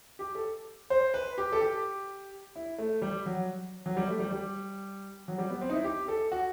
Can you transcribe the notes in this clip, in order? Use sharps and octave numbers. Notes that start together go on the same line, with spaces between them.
G4
A4
C5
B4
G4
A4
G4
E4
A3
G3
F#3
F#3
G3
A3
G3
G3
F#3
G3
B3
C4
D#4
E4
G4
A4
F#4